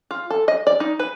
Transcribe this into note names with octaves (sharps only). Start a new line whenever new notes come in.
F4
A4
D#5
D5
D#4
B4